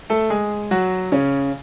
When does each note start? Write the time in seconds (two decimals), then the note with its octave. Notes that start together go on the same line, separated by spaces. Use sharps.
0.10 A3 A4
0.30 G#3 G#4
0.71 F#3 F#4
1.12 C#3 C#4